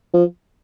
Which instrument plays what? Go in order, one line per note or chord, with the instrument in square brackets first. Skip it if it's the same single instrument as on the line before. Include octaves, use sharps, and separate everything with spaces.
[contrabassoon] F3